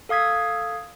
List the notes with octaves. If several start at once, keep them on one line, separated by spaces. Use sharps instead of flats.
A4 F5 D#6 G#6 B6